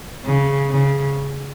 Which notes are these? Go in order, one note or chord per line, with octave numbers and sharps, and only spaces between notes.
C#3
C#3